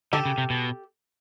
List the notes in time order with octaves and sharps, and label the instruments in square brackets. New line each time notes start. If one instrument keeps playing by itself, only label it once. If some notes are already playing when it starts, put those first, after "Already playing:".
[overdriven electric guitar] D3 [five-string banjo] G4 A4
[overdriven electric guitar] C#3
C3
B2